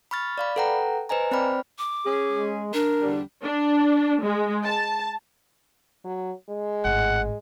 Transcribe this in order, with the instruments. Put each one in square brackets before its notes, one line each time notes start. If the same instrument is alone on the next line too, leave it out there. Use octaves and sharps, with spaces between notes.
[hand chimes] B5 C#6 F6 A6
D5 F5 B5
A4 B4 F#5 G5 A#5
B4 C5 D#5 G#5 A#5
C4 C5 D5 G5 B5 F6
[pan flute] D6
[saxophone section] C#4 G#4
[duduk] G#3
[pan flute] D4 [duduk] A#4
[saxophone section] E2 D3 G3
[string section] D4
G#3
A5
[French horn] F#3
G#3
[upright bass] G#1 A2 [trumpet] F#5